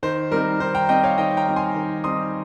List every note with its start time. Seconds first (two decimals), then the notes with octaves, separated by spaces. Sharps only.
0.03 D#3 C5
0.31 G3 C4 D#4 A#4
0.60 D#3 C5
0.75 G5 A#5
0.89 G3 C4 D#4 D#5 G5
1.03 C#5 F5
1.18 D#3 D#5 G5
1.37 G5 A#5
1.46 G3 C4 D#4
1.56 G#5 C6
1.75 D#3
2.04 G3 C4 D#4 C6 D#6